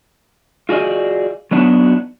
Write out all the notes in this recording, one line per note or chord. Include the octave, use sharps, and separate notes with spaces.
F4 F#4 G#4 D5 D#5
F#3 B3 D4 D#4 F4 F#4